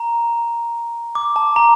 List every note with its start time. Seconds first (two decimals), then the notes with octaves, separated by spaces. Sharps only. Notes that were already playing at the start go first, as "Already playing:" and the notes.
Already playing: A#5
1.15 D6
1.36 A5
1.56 A#5